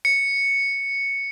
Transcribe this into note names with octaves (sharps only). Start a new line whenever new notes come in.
C#7